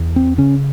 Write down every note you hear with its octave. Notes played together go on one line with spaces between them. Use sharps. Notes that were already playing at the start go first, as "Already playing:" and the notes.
Already playing: E2
C4
C#3 C#4